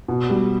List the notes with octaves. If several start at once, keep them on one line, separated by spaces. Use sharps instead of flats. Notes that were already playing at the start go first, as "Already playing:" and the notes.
B2
G3